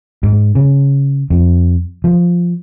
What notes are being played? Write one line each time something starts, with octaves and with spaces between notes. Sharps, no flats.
G#2
C#3
F2
F3